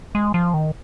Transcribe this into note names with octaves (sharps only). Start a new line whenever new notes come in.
G#3
F3
D#3